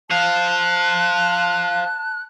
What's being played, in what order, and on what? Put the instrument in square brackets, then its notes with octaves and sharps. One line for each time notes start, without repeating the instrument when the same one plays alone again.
[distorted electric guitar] C5 F5 [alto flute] A5 [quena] F#6